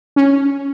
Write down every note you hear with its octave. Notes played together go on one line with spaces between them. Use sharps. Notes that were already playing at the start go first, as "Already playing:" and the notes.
C#4